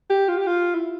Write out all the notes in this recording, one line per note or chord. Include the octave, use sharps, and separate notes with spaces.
G4
F4
G4
F4
E4